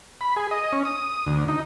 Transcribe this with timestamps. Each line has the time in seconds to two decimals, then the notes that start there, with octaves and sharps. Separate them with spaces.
0.21 B5
0.36 G#4
0.51 D#5
0.73 C#4
0.85 D#6
1.27 D2
1.48 D#4